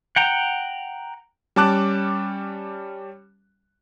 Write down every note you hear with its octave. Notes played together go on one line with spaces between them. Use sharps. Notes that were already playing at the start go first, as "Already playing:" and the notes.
F#5 G5 A#5
G3 C#4 A5 D6 F#6